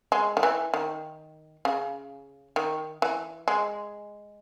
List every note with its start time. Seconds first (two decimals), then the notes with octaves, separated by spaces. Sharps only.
0.12 G#3
0.37 D#3
0.43 E3
0.74 D#3
1.65 C#3
2.56 D#3
3.02 E3
3.48 G#3